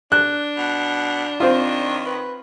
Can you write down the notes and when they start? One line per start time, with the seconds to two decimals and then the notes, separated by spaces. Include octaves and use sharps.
0.12 D4 F#6
0.57 B2
1.40 D#3 C4 F4
2.06 B4